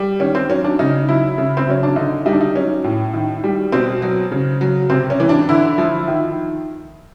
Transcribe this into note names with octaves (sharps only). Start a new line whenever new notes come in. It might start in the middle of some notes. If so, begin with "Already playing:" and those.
Already playing: G3
D#3 C#4
C4
F#3 C#4
D4
C#3 D#4
F#3 E4
C#3
C4
F#3 C#4
D4
D3 D#4
G3 D#4
D4
D#4
F#3 C#4
A2
D#3
G3
B2 C4
F#3
C#3
F#3
C3 C4
C#4
E3
D4
D3 E4
F3
D#3